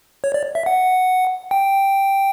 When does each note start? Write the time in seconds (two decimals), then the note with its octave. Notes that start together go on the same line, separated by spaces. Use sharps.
0.24 C#5
0.34 D5
0.55 E5
0.66 F#5
1.51 G5